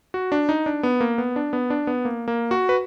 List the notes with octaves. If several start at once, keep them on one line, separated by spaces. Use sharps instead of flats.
F#4
D4
D#4
D4
B3
A#3
B3
D4
B3
D4
B3
A#3
A#3
F#4
B4